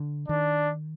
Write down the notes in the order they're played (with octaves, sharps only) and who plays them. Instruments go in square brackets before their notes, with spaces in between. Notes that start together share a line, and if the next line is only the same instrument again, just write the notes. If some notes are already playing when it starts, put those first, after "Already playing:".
Already playing: [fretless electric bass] D3
[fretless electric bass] D#3 [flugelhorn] D4